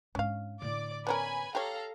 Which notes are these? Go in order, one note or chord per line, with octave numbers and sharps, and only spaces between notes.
G#2 C#4 D4 F5
A2 D3 D5 D6
B3 C#4 A#4 B4 G#5 B5
G4 A4 C#5 F5 A#5